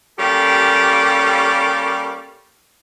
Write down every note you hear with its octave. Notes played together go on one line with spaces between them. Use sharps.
G3 A#3 C#4 G4 A4